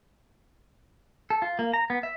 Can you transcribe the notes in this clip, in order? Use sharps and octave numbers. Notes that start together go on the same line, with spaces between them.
A4
F4
A#3
A#5
B3
E5